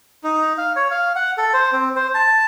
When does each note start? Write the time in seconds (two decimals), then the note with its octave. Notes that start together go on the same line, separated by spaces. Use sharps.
0.24 D#4
0.58 F5
0.76 C#5
0.91 F5
1.15 F#5
1.37 A4
1.53 C5
1.72 C4
1.96 C5
2.14 A5